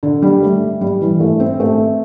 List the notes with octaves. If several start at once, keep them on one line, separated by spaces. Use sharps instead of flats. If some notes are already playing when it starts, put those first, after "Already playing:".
D3
G3
A3
G3
E3
A3
C4
A3